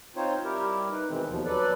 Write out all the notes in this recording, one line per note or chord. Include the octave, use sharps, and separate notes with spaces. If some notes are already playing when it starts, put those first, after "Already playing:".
C4 D#4 F4 C5 C#5
G3 E4 G4 A#4
D#4 B4
B2 D#3 E3 G#3 C4
D#2 B2 F3
F#3 A4 B4 D5